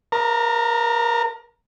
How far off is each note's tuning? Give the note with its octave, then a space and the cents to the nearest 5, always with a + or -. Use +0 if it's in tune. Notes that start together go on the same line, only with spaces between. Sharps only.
A#4 +25 A#5 -35